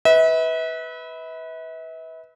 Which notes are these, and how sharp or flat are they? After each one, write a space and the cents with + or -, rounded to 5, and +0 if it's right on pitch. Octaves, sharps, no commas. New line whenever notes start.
B4 +0 E5 -40